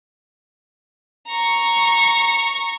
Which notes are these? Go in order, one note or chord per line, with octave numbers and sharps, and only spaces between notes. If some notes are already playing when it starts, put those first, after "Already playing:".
A#5 C#6